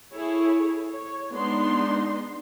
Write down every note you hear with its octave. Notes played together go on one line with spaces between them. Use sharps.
E4 G#4 A4 C#5
C#5
G#3 B3 D4 D#4 C6